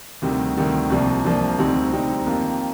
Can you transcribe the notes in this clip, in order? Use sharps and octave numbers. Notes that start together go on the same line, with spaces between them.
D2 C3 D#3 G3
D2 C3 D#3 G3
C2 C3 F3 A#3 D4
C2 C3 F3 A#3 D4
D2 C3 G3 C4 D#4
D2 C3 G3 C4 D#4
F2 D#3 A#3 F4